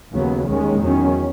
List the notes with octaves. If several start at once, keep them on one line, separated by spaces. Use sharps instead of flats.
D#2 C#3 F#3 B3
D#2 D#3 G#3 C#4
E2 D#3 F#3 C#4